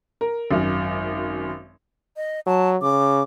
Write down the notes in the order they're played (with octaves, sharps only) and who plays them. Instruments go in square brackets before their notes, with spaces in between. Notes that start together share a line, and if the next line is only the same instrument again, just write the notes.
[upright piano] A#4
G#1 F#2
[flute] D#5
[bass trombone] F#3 [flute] A5
[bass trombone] C#3 [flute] D6